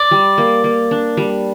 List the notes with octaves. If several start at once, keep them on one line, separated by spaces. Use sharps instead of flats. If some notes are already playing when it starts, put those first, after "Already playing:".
Already playing: D5
G3
A#3
A#3
D4
G3